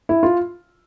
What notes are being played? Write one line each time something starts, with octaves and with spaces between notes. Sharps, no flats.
E4
F4